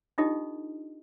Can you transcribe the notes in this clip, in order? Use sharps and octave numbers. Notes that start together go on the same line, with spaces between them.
D4 D#4 F4 G4 A4 D#5